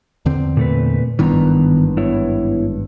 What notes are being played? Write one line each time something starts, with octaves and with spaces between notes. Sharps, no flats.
E2 D3 C4
A#2 A3 B4
G#1 G2 D#3 E3 B3 A#5
B3 E4 C#5